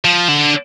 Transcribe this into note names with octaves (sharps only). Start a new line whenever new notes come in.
F3
D3